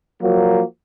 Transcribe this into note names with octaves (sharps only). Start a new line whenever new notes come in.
F3 F#3 A#3 F#4 A#4